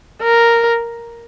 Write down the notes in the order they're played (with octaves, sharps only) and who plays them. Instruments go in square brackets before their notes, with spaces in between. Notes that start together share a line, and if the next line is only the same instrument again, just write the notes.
[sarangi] A#4